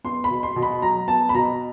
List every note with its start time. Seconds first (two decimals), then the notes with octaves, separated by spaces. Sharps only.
0.04 B3 C6
0.24 B5
0.30 B2
0.43 C6
0.56 B2
0.63 B5
0.82 F#3 A#5
1.08 B3 A5
1.29 B5
1.34 B2 A#5